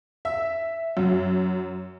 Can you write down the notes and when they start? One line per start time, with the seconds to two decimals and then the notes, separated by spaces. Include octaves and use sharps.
0.25 E5
0.97 F#2